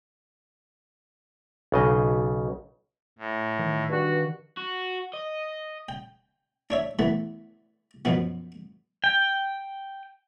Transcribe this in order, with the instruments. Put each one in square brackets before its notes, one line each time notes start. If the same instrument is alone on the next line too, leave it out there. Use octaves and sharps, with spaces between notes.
[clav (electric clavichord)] B1 C#3 D#5
[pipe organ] A2
[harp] D#3
[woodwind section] G2 F#4
[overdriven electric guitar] F#4
D#5
[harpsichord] G5
D4 C#5 E5
E3 A3 B3
F#2 B2 F3 B3
[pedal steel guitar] G5